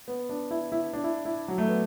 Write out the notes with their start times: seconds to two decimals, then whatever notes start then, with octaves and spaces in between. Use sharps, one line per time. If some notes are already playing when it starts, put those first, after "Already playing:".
0.08 B3
0.29 D4
0.51 E4
0.72 E4
0.93 D4
1.04 E4
1.25 E4
1.48 F#3
1.58 A3
1.68 B3